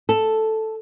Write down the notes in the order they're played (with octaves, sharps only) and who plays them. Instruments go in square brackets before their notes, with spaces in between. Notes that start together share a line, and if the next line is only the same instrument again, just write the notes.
[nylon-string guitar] A4